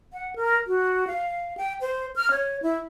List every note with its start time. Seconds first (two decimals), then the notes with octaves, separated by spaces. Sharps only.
0.13 F#5
0.36 A#4
0.67 F#4
1.07 F5
1.57 G5
1.81 C5
2.16 F6
2.31 C#5
2.62 E4